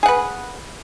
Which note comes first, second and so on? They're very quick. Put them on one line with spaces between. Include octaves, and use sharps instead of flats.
G#4 F#5 B4